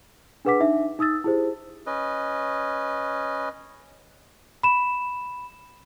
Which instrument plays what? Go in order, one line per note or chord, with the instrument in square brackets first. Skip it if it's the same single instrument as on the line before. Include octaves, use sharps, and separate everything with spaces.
[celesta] D4 G#4 B4 F#5 D6 B6
D4 D#4 E5
D#4 D#6 E6 A6
E4 G4 G#4 C5
[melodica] C#4 B4 D#5
[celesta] B5 E7